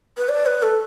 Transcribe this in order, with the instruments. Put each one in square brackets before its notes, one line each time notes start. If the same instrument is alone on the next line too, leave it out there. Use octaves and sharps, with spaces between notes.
[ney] B4
D5
B4
A4